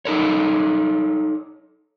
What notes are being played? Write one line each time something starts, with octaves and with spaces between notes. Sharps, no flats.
D#4 A4 A#4 C#5